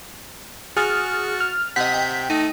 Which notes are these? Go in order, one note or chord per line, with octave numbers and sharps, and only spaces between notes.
F#4 G#4 D#6 F6 A6
F6
C3 D#5 F#5 B6
G5
A3 D#4